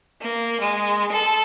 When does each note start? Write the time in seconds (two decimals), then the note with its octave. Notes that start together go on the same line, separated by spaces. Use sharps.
0.20 A#3
0.60 G#3
1.12 A4